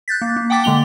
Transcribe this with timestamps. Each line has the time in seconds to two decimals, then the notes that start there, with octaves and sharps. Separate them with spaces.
0.08 F#6 G6 A6 B6
0.21 A#3
0.36 A#3
0.50 F#5 G5 A5 D6 A6 B6
0.64 D3 G#3 A#3 F7 G7